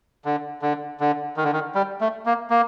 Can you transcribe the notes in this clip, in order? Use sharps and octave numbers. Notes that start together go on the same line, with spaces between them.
D3
D3
D3
D#3
D3
D#3
G3
A3
A#3
A#3